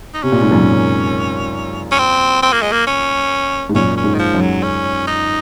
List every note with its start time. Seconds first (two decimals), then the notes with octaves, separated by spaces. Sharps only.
0.14 D#4
0.23 C3 C#4
0.32 A#2
0.42 G#2
0.51 F#2 A#2
1.92 C#4
1.99 C4
2.43 C4
2.53 A#3
2.62 G#3
2.72 A#3
2.87 C#4
3.69 G#2
3.74 F#2 A#2 C#4
3.97 C#4
4.04 G#2
4.14 D#3
4.19 F3
4.34 F#2
4.41 F#3
4.63 C#4
5.07 D#4